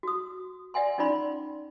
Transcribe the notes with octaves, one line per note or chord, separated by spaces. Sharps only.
F#4 D#6
D5 E5 F#5 G#5 C6
C#4 D#4 F4 D5 B5 C6